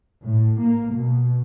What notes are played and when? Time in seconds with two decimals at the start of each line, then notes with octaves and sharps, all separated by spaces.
0.23 A2
0.60 A#3
0.93 B2